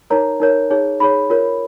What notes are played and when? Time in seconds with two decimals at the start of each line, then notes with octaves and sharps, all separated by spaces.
0.10 D#4 A#4 C#5 A#5
0.40 D#4 A#4 C#5
0.70 D#4 G#4 C#5
1.00 D#4 G#4 C#5 B5
1.30 F4 A#4 C#5